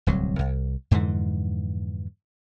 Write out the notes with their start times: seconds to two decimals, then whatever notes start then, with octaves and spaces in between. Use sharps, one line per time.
0.07 D1 C2 F#3
0.39 C2
0.91 F2 G#2 D3 E3